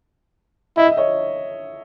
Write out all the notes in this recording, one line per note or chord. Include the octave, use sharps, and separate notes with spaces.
E4 D#5
E5
C#5 D#5